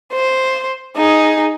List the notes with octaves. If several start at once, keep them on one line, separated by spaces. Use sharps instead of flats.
C5
D#4 G#4